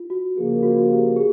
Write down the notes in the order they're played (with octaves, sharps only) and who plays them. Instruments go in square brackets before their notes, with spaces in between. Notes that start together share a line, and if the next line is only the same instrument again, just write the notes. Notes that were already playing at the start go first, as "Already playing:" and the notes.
Already playing: [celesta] F4
F#4
[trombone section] C#3 F3 A#3 [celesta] G#4
[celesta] F#4
F#4
G4
G#4